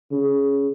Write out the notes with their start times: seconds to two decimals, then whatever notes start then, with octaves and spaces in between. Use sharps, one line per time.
0.12 C#3